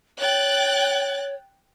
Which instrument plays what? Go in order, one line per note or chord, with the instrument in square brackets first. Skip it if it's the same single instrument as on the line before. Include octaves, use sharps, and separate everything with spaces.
[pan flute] C#5 [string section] G5 F#6 A6